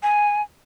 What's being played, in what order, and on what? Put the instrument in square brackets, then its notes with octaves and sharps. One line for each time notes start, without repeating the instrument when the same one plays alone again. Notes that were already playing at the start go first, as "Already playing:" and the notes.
[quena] G#5